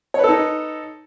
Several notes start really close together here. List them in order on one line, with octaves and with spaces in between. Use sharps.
C#5 B4 A4 D#4